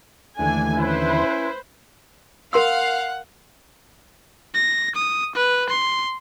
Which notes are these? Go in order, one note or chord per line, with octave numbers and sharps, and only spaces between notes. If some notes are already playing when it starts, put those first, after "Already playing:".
D#2 D3 E3 A3 D4 G#5
C#4 E4 B4 C5
A#4 F5 F#5 C6 E6
A#6
D#6
B4
C6